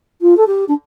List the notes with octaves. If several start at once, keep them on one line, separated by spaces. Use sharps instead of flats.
F4
A4
G4
D4